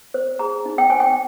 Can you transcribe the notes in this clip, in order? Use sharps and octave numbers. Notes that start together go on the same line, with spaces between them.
C5
G#4 A#5
D#4
G5
C5 G#5
G5